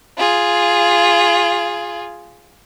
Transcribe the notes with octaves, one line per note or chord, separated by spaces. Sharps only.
F4 G#4